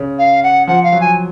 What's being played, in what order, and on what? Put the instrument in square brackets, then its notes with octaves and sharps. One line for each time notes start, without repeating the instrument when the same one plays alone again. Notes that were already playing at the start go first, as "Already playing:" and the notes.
Already playing: [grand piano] C#3
[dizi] F5
F#5
[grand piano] F3 [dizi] F#5
[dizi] F5
[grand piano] F#3
[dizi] G#5